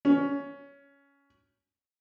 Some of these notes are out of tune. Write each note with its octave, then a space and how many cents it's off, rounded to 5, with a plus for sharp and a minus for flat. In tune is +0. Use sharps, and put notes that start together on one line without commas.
C#4 +15